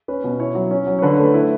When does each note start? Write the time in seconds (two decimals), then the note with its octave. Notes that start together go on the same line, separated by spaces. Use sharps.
0.08 C#4 B4
0.24 B2
0.40 E4 C#5
0.55 F#3
0.71 C#4
0.87 F#3
0.99 C#5
1.02 D3 B4
1.13 C#5
1.19 A3 B4
1.34 E4 B4